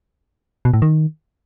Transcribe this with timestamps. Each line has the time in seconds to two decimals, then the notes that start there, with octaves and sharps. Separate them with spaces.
0.65 B2
0.74 A2
0.82 D#3